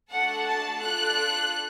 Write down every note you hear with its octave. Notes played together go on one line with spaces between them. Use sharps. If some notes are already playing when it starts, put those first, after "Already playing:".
A3 D4 F#4 A4 F#5
A5
D4 F4 A4 F#6